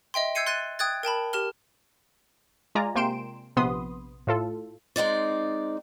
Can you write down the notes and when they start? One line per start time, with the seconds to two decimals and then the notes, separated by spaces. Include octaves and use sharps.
0.14 D#5 E5 G5 C6
0.35 E6 G6 G#6 C7 C#7 D#7
0.46 C6 F#6 A6 D#7
0.79 G5 D#6 F#6 G#6 A6
1.03 A#4 G5 A5 B5
1.33 G4 A#4 F6 G7
2.75 G#3 F4 D5 G#5 A#5
2.95 C3 A#3 G5 C6 D7 E7
3.57 A#1 C3 B3 B5 C6 D#6
4.27 A2 F4 A4
4.96 G#3 C4 D#4 D5